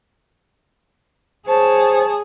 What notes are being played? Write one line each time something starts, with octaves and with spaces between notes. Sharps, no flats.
G#4 C5 C#5 A5